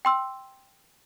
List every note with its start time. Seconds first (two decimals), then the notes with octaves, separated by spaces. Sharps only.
0.05 G5 C6 E6